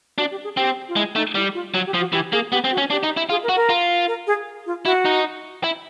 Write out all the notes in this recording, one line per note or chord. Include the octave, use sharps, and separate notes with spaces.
D4 F#4
G4
G#4
C4 G4
F4
G#3 E4
A3 D#4
G3 E4
F4
F#3 F#4
G4
F3
F#4
E3 G4
A#3 G#4
B3 G4
C4
F#4
C#4
D4 G4
D#4
E4
F4 G#4
A#4
F#4
A#4
F4
A#4
G#4
F4
E4 F#4
D#4
E4